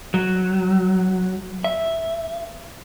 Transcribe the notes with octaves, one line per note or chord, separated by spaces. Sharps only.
F#3
E5